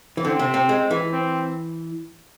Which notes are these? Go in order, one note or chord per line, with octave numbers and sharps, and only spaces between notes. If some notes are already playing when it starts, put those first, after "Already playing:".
E3
D3 C4
C3
C3
G#3
E3
C4